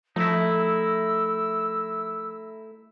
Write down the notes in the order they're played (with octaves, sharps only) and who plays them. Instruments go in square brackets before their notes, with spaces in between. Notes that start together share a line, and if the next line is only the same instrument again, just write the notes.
[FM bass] F3 [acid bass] A3 [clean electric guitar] D#4 E4 [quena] E6